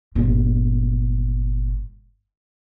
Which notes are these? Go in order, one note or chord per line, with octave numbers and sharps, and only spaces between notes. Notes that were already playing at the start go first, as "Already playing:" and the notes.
G1 A#2